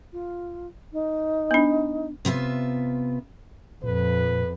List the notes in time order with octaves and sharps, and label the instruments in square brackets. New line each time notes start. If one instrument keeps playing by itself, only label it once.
[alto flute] F4
D#4
[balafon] B3 D4
[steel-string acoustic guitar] C3 B3 F4 E5
[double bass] F2 [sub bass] A#2 [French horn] B4